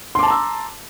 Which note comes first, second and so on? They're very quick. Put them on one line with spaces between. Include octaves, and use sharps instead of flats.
C6 D6 A5 A#5 E6